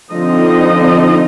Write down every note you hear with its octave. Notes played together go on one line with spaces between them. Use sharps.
D3 F3 C4 D#4 D#5